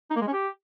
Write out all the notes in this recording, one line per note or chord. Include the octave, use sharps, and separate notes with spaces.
D#4
A#3
G#3
C#4
G4